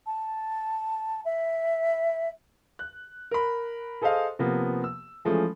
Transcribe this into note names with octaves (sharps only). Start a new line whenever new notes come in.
A5
E5
F#6
A#4 B5
G#4 A4 C5 D#5 F5
C3 F3 A#3 B3
E6
E3 F3 G#3 A3 C#4